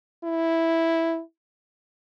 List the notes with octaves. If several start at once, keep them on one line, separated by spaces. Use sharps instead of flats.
E4